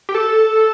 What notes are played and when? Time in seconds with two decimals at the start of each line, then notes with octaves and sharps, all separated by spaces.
0.09 G4
0.15 A4